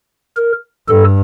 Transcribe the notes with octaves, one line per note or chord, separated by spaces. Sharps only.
A#4
G2 A4